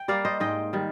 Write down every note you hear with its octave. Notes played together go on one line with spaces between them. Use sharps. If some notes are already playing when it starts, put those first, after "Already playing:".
Already playing: G5
G3 A#3 D5 F5
C5 D#5
G#2 D#5 G5
D#3 G3